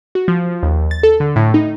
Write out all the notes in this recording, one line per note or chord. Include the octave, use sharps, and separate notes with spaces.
F#4
F3
D#2
A6
A4
D3
A2
D#4